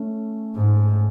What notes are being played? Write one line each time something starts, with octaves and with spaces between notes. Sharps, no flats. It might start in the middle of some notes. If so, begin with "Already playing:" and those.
Already playing: A3 C#4
G#2